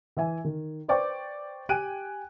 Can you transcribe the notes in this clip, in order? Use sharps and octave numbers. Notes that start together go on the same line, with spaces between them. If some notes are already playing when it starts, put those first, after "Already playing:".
E3 E5 G#5
D#3
B4 C5 D5 G5 C#6 D6
G4 G5 G#5 F#6 D7 D#7